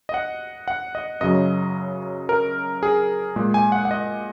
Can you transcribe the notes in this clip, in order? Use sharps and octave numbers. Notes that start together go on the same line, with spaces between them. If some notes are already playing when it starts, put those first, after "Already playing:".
D#5
F#5
F#5
D#5
F#2 C#3 F#3 D#5
A#4
G#4
A#2 G#3
G#5
F#5
F#5
D#5